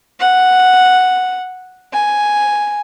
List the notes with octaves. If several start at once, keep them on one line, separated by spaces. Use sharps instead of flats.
F#5
G#5